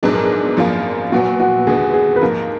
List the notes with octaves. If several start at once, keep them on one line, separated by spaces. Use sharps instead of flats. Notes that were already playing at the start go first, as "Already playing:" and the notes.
A#1 G#2 F#3 B3 D4 G#4
A#4
G#4
G#1 F#2 F3 A#3 F4
A#2 F#3 B3 F#4
F#4
D#2 D3 G#3 B3 G#4
G#4
B4
G#2 F3 A#3 A#4